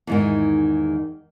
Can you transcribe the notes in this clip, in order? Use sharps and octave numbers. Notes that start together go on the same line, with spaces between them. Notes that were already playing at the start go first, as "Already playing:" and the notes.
E2 G#2 D#3